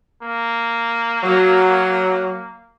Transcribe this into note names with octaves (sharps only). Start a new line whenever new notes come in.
A#3
F#3